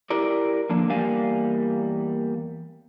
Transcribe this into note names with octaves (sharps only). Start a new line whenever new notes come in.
E4 G4 A#4 D5
D3 F3 A#3 D4
E2 G3 A#3 F5 G#5